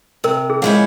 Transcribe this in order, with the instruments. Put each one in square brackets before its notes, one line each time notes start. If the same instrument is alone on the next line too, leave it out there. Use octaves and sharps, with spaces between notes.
[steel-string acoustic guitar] C3 [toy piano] A#4
[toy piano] G#4
[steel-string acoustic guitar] F3 G#3 C#4 E4